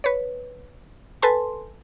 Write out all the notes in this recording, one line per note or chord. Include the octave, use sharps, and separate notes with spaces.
B4 C#5
A4 B4 G#5 A5 C6